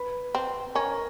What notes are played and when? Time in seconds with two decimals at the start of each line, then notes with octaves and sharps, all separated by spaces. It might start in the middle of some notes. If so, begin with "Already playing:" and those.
Already playing: B4 B5
0.35 C4
0.75 C#4 A#4 A#5